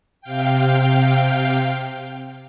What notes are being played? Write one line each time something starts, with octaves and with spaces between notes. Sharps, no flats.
C3 F5 G5